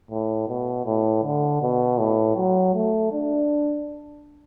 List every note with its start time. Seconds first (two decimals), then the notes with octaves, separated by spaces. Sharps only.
0.11 A2
0.48 B2
0.86 A2
1.24 D3
1.62 B2
1.99 A2
2.37 F#3
2.75 A3
3.12 D4